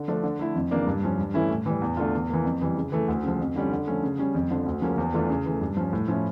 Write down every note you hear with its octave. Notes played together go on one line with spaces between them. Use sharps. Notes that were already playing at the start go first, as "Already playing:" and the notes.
Already playing: D3
F3 A3 D4
D3
A3 E4
F2
C#3 E3 A#3 D4
G2
F3 C#4
G2
E3 A3 C#4 E4
A2
E3 G3
E2
D3 A3 D4 F4
E2
E3 A#3
F2
E3 G3
C#3
E3 A3
D2
C#3 F3
F2
D3 G3 C#4 F4
D3
F3 A3 C#4
C#3
G3 C#4
F2
D3 F3
D2
C#3 F3 A#3 C#4
E2
E3 A3 D4 F4
C#3
E3 A3
G2
F3 C#4
A2
F3 C#4 E4